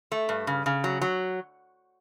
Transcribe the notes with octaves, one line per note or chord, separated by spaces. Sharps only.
A3
G2
C#3
C#3
F#3
F#3